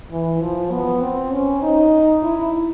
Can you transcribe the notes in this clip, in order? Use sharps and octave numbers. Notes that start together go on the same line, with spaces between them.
E3
F3
B3
C4
C#4
D#4
E4